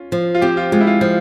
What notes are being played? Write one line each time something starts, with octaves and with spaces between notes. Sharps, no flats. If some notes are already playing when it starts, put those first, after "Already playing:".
Already playing: C#4 F4
F3
F4
C4 G4
F4
G#3 F4
E4
F4
F3